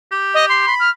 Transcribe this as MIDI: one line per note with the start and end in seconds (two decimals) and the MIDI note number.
0.12 0.63 67
0.34 0.45 75
0.49 0.75 84
0.67 0.89 83
0.80 0.90 89